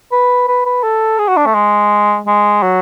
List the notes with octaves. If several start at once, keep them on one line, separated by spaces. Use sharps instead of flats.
B4
B4
B4
A4
G#4
F#4
D4
A3
G#3
G#3
F#3